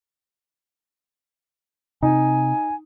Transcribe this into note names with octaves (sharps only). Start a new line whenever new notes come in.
C3 D#4 G#5